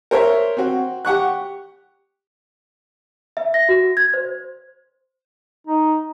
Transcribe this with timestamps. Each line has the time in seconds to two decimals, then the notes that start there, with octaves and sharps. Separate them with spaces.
0.11 A#4 C5 C#5 E5
0.57 C4 F#4
1.05 G4 F#5 C#6 F#6
3.37 E5
3.54 A#6
3.69 F#4
3.97 G#6
4.14 C5
5.67 D#4